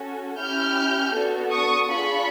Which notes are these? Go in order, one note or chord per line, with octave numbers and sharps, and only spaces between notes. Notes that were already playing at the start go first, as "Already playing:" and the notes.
Already playing: C#4 F#4 A4
C#4 E4 G4 F6 G6
B3 D4 F#4 A4
C#6 D#6
D4 F4 G#4 B5 C#6